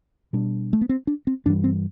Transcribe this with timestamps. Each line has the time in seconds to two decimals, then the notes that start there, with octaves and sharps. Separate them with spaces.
0.33 B2 G3 D4
0.73 A3
0.81 B3
0.89 C4
1.07 D4
1.27 C4
1.45 G2 E3 G3 D4
1.64 C4